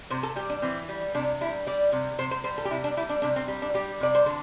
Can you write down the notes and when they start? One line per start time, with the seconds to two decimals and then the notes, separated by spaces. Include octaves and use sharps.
0.10 C3 C5
0.23 A4
0.36 G3 G4
0.50 D4
0.62 E3 C4
0.89 G3
1.15 C3 D4
1.41 G3 E4
1.67 G3 D5
1.92 C3
2.18 C3 C5
2.31 C5
2.44 G3 C5
2.58 A4
2.65 G4
2.71 C3 E4
2.84 D4
2.97 G3 E4
3.09 D4
3.22 C3 D4
3.36 C4
3.48 G3
3.62 D4
3.74 G3 G4
4.00 C3 D5
4.15 C5
4.26 D3 A4